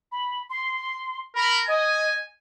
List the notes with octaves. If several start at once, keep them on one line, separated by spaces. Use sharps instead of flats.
B5
C6
A#4 B5
D#5 G#5